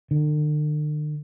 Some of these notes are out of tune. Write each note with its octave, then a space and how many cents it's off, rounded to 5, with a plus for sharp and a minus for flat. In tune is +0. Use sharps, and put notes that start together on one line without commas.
D3 +45